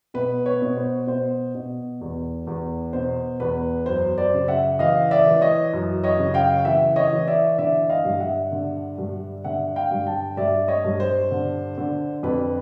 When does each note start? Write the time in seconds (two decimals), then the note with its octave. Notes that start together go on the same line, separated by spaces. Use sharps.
0.14 B2 B4
0.46 B4 C#5
0.62 B2
0.77 C5
1.07 B2 C5
1.55 B2
2.01 E2
2.47 E2
2.93 B2 C5
3.40 E2 B4
3.86 F#2 C5
4.18 C5 D5
4.34 C#3
4.48 E5 F#5
4.79 E3 D#5 F5
5.11 D5 E5
5.27 E3
5.41 C#5 D#5
5.73 F#2
6.04 C#5 D#5
6.19 C#3
6.34 F5 G5
6.65 E3 E5 F#5
6.96 C#5 D#5
7.13 E3
7.27 D5 E5
7.58 D3 D5 E5
7.89 D#5 F5
8.05 G2
8.20 E5 F#5
8.52 D3
8.98 G2
9.44 D3 E5 F#5
9.76 F5 G5
9.91 G2
10.06 G5 A5
10.37 G2 D5 E5
10.68 C#5 D#5
10.85 G2
11.00 C5
11.31 D3
11.78 D3
12.23 F2 B4